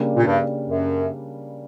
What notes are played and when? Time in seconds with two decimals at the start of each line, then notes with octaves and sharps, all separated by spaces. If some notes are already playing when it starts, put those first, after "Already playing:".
Already playing: C#3 G3 A#3 D4
0.16 A#2
0.25 G2
0.68 F#2